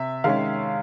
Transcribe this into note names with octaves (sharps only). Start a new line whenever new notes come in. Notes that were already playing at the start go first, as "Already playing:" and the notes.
Already playing: C3 E5
D#3 G#3 C#4 F5